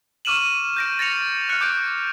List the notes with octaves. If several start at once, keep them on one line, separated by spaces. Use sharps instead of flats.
C#6 D6 F6 D#7 E7 F#7
G6 A#6 D7
A6 A#6 C#7 F7
F6 F#6 C#7
D6 G6 A6 D7